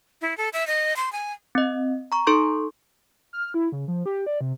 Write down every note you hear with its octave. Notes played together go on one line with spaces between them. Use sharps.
E4
A4
E5
D#5
C6
G#5
C4 D#5
A#5 C#6
D#4 A4 C6 C#6 G6
F6
E4
C#3
F3
G4
D5
C3